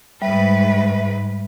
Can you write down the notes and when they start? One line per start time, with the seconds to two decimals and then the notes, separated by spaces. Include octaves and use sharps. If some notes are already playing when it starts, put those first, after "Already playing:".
0.22 G#2 G3 B4 E5